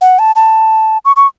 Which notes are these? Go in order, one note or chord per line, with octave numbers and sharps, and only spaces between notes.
F#5
A5
A5
C#6
C#6